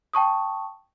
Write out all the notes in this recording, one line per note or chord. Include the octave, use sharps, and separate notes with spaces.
G5 A5 C#6 D#6